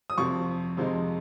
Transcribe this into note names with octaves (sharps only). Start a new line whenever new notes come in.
D#6
F2 C3 F3 C#6
F2 C3 F3 G#3 D#4